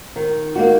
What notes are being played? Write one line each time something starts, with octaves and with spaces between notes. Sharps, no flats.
D#3
A#3 D#4 F#4